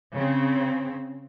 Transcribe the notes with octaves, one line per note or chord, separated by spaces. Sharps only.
C#3 C4